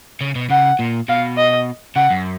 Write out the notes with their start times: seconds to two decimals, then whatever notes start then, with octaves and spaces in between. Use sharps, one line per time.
0.21 C#3
0.35 B2
0.50 C#3 F#5
0.79 A#2
1.08 B2 F5
1.37 D#5
1.95 C#3 F#5
2.11 F#2